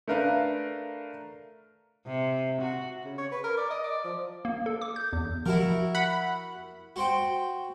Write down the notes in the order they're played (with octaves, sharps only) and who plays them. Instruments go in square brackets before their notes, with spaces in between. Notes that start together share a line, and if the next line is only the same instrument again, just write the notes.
[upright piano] A3 D4 A#4 B4 F5
[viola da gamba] C3
F#4
[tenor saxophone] C#3
C#5
B4
A#4
D5
D#5
D5
F3
[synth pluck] A#3
A4
D6
G6
E2
[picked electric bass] F3 [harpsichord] E4 F#4 A#4
[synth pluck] F#5 B5
[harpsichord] F#4 C5 G5